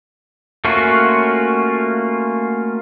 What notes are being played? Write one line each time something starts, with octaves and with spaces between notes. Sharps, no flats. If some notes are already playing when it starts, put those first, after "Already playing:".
A3 A#3 C#4 F4 F#4